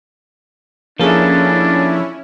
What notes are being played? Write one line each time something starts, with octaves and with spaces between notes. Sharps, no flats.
F3 A#3 C#4 D4 E4 G#4 A4